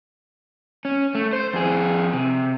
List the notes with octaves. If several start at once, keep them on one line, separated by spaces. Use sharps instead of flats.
C#4
A3
C5
F2 G#4
C3